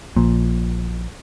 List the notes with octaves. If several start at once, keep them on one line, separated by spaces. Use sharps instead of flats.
A#1 A#2